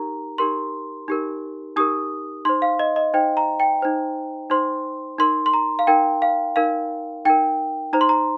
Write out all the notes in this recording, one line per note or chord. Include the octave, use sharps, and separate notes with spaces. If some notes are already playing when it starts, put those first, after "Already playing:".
Already playing: D#4 G4 A#4 A#5
D#4 G4 A#4 C6
D#4 G4 A#4
D#4 G4 A#4 D#6
D#4 C5 C6
F5
D#5
D#5
D#4 C5 G5
A#5
G5
D#4 C5
D#4 C5 C6
D#4 A#4 C6
C6
A#5
F5
D#4 A#4 G5
F5
D#4 A#4 F5
D#4 A#4 G5
D#4 C5 A#5
C6
A#5